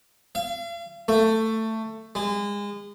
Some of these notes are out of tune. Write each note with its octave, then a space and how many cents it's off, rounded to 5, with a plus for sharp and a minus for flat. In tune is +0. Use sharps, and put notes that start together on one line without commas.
F5 -40
A3 +15
G#3 -30